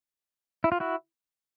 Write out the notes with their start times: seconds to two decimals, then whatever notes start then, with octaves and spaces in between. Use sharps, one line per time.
0.64 E4
0.72 F4
0.80 E4 F#4